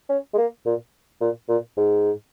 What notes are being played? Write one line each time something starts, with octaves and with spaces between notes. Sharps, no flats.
C#4
G#3
A#3
A#2
A#2
A#2
G#2